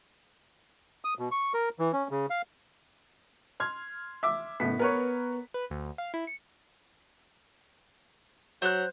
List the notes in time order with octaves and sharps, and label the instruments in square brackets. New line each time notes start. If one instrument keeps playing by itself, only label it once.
[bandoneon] D#6
B2
C#6
A#4
E3
C#4
C#3
F5
[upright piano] C6 F6 G#6
[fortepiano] E5 D6
[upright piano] F#1 A2 B6 [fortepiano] B3
[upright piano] B3 [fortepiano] A#4 B4 C#5
[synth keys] B4
D2
F5
E4
C#7
[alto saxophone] F#3 [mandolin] C5 F#6